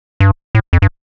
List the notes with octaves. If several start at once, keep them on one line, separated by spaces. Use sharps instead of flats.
G2
A2
F2
G2